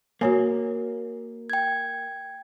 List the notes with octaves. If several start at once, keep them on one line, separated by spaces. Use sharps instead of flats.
A#3 F#4 C#5 G#5
G5 G#6